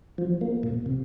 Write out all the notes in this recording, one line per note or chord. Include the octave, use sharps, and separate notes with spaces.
F3
A#3
A#2
C3